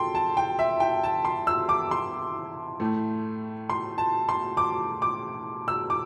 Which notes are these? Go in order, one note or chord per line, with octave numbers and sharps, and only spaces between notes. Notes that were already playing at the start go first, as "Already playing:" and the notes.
Already playing: A4 G5 C6
A5
G5
E5
G5
A5
C6
E6
D6
C6
A2 A3
C6
A5
C6
D6
D6
E6
D6